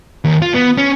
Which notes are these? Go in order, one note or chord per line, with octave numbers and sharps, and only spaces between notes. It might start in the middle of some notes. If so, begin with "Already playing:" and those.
D#2
F4
B3
C#4